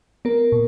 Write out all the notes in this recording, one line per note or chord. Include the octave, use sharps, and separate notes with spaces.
B3 A#4
A#2